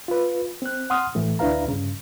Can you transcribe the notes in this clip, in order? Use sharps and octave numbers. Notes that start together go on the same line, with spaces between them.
F4 B4
C4 F#6
F#5 C6 D#6 F6
A2 E3 A3
D2 D4 E4 B4 F5 A#5
G2 C#3